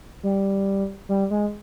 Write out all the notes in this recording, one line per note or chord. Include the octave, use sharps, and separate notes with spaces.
G3
G3
G#3